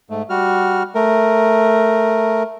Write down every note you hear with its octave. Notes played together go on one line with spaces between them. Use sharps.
G#2 A3
G3 F#4 F6
A3 A#4